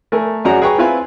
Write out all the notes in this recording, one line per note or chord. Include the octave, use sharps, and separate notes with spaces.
A3 A#4 G#5
F#2 C#4 F#4 G#4 D5 A#5
G#4 B4 G5 A#5 C#6
C4 E4 F4 B4 F5 G#5